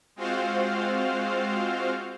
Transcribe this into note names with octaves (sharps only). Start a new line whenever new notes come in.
G#3 C4 F4 F#4 C5 F5